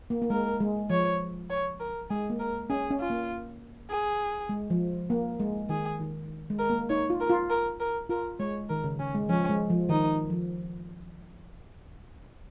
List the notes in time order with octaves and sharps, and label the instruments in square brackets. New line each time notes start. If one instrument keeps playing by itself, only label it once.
[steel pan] A#3
A#3
[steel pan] G#3 [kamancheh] A#4
[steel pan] G#3
[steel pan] F3 [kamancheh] C#5
[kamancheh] C#5
A#4
[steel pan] G#3 [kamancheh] G#4
[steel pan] A#3
[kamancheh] A#4
[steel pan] C#4 [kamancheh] G#4
[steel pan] C#4
[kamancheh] F4
[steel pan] A#3
[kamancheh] G#4
[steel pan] G#3
F3
A#3
G#3
[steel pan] D#3 [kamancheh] G#4
[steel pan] D#3
G#3
[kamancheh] A#4
[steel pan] A#3
[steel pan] D#4 [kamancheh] C#5
[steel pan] F4
[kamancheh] A#4
[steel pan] F4
[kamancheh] A#4
A#4
[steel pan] F4 [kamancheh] A#4
[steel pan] G#3 [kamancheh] C#5
[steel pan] D#3 [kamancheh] A#4
[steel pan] C#3
[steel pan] C#3 [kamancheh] C#4
[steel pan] G#3
[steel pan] F3 [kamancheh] C#4
[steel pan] G#3
F3
[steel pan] D#3 [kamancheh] D#4
[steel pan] F3